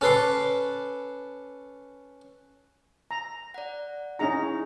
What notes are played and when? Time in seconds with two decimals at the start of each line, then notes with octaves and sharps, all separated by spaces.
0.01 C#4 A4 B4 C6 D6
3.11 A#5
3.54 D5 F#5
4.19 C#4 D#4 E4 G#4 A#5